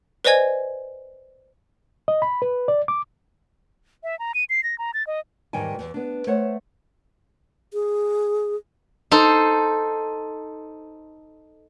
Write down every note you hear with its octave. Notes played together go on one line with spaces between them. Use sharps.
B4 C5 D5 D#5 G#5 G#6
D#5
B5
B4
D5
D6
E5
A#5
D#7
C7
A#6
A#5
A6
D#5
E2 G#2 D#3 G3 G5 G#5
E2 E3
B3 D4
A3 C5 C#5 F#5
G#4
D#4 A4 C5